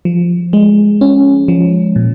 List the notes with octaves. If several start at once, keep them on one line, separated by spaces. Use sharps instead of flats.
F3
G#3
C#4
F3
A#2